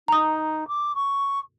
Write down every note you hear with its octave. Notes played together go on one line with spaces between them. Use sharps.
D#4 A#5 D#6
D6
C#6